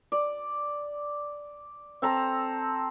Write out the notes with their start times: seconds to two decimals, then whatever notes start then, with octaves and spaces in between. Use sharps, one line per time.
0.12 D5
2.02 C4 A4 A#5